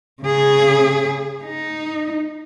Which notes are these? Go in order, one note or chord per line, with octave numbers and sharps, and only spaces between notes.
C#3 G#4
D#4